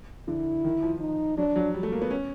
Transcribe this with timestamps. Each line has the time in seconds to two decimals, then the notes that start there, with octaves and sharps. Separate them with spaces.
0.28 D3 E4
0.64 D#3
0.83 F3
1.01 D#4
1.38 F#3 D4
1.56 F#3
1.74 G3
1.83 A3
1.92 A#3
2.02 B3
2.11 C#4